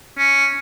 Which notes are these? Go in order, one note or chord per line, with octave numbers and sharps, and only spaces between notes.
C#4